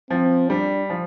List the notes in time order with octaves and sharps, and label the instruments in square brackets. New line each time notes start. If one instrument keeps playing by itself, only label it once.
[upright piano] F3 [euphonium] C4
[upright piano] G3 [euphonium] D4
[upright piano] F3